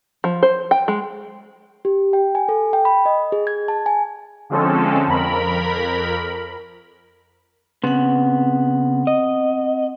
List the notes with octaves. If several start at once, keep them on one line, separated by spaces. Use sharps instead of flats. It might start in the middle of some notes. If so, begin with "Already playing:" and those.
F3
C5
G5
G#3
G4
G5
G#5
A4
G5
B5
D#5
G#4
G#6
A5
G#5
D3 F3 G#3 C4 C#4 A4
F2 A#4 B5
C#3 B3 C4 F#5
D#5